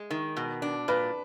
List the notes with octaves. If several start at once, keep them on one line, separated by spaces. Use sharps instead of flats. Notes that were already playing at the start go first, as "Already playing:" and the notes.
Already playing: G#3
D#3
B2
D4
A#2 B4